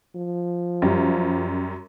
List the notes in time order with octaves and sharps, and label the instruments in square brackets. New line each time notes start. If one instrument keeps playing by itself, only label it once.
[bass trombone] F3
[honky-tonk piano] F#2 G3